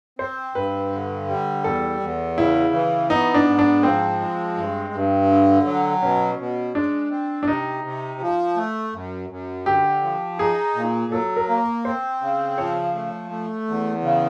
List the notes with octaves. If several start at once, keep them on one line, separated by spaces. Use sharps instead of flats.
C4 C5
G2 B4
D3
G3
E2 A4
E2
C#3 E4
E3
B3 D#4
D4
G#2
D4
F3 C4
G#3
G2
G2
D3
F#3
B2 C#4
B2
G#3 D4
C4
D4
C3 D#4
C3
F3
A3
F#2
F#2
D3 G4
F3
D#4 G#4
A#2
F#3 A4
A#4
A#3
C4 C5
C#3
F3 C#5
A3
A3
E2
C#3